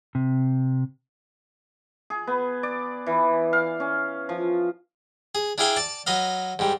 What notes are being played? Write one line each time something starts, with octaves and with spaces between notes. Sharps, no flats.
C3
G#4
B3
D5
E3
F5
C#4
F3
G#4
D4 E4 G#4 F5 G5 G#5
D5 A5
F#3 B4 D#5 F5
G#2 G3